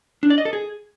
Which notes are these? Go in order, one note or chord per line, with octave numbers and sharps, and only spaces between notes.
D4
D5
D#5
A4
G#4